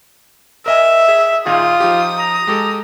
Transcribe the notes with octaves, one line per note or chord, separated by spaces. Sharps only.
A#4 D#5 E5 G#5
G#4
A#2 D#3 F4 G#4 D#6
F3 D#4 G4
A#5
G#3 G4 A4